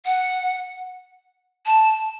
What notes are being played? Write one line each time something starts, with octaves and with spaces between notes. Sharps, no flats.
F#5
A5